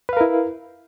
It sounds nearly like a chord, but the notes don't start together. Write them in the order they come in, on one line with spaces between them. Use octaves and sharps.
B4 F5 A#4 E4